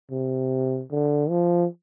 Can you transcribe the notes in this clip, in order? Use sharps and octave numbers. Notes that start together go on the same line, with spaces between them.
C3
D3
F3